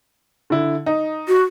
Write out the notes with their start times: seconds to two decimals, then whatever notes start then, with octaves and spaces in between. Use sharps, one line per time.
0.50 D3 E4
0.86 D#4
1.28 F#4